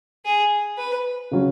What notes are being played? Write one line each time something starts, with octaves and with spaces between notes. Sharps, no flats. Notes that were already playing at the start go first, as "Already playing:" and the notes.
G#4
B4
C#3 F#3 C#4